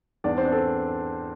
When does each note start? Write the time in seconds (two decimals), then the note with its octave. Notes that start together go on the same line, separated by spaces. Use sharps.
0.24 E2 D4 D5
0.38 C4 C5
0.45 D4
0.52 A4